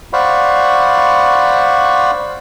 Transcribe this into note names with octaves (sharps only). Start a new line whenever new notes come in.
C5 D5 F5 F#5 B5 C#6